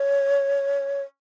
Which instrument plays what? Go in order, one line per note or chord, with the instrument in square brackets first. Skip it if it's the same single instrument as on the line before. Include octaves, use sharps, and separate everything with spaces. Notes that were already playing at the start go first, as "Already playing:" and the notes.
Already playing: [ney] C#5